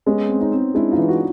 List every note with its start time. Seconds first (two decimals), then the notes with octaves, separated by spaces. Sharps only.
0.06 G#3 B3 C#4
0.29 C4
0.41 C#4 D#4
0.51 C4
0.74 G#3 D4 E4
0.91 D#4 F4
0.97 E3
1.08 E4 F#4